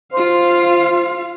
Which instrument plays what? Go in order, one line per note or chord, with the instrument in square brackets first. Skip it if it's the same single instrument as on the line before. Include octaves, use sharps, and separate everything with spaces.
[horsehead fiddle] F4 F5 [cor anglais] C5